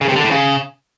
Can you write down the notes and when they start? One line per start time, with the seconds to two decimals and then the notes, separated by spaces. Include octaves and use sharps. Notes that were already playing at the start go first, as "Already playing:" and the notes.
0.01 C#3
0.09 C3
0.16 D3
0.24 A2
0.31 C#3